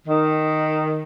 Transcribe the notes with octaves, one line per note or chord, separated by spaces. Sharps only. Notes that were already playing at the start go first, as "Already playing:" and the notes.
D#3